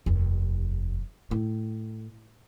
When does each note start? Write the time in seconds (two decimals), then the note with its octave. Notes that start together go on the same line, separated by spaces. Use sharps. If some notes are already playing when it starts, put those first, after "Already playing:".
0.06 F1 D#2
1.31 A2